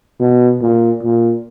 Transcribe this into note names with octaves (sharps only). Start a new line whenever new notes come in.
B2
A#2
A#2